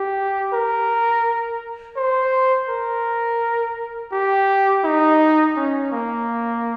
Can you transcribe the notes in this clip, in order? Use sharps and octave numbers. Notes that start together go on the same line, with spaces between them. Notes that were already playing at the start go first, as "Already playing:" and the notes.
Already playing: G4
A#4
C5
A#4
G4
D#4
C#4
A#3